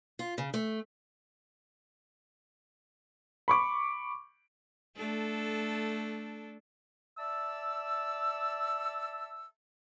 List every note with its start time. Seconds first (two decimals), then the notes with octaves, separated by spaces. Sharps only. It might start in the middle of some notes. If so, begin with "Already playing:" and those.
0.19 F4
0.38 C#3
0.54 A3
3.48 B5 C#6 D6
4.96 A3 D4 A4
7.17 D5 E5 A5 E6